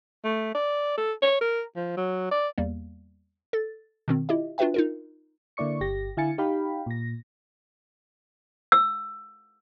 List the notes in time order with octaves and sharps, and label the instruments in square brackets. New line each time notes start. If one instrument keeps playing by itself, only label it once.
[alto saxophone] A3
D5
A4
C#5
A#4
F3
F#3
D5
[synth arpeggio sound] E2 G3 A#3
A4 A6
B2 D#3 C4
E4 F4 G4 D#5 E5
D4 F4 F#4 B4 E5 G5
D#4 F4 A#4
[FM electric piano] D3 A#3 E4 D5 C#6 C#7
G1 G4 A#6
D3 E4 F5 G#5 A6 C#7
D#4 G4 F5 G5 B5
A#2 A#6
[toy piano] E6